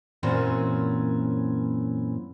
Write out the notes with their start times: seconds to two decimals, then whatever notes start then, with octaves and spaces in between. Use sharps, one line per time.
0.23 F#2 A#2 E3 C4 C#4